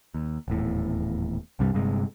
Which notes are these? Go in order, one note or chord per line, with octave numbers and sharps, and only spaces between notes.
D#2
D#1 E2 A2
C2 G2 C3 G3
G1 G2 C3 G#3